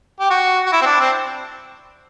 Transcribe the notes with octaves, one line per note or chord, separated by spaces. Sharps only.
G4
F#4
F#4
E4
C4
D4
C4